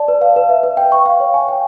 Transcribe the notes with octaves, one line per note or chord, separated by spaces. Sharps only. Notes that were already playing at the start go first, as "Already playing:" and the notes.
Already playing: D5 A5
B4
F5
B4
E5
B4
G5
C#6
F5
C#5
G#5
G5